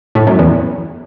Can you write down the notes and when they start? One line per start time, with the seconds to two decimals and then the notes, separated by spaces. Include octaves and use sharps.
0.15 A2
0.27 F#2
0.39 E2